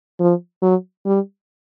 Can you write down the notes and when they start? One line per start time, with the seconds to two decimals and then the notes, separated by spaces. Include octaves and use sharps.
0.20 F3
0.62 F#3
1.06 G3